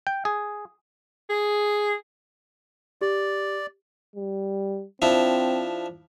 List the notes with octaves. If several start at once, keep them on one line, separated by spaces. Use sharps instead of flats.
G5
G#4
G#4
G4 D5
G3
F3 C4 D4 E4